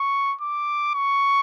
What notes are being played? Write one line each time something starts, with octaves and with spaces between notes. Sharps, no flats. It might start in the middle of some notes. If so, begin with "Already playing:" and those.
Already playing: C#6
D6
C#6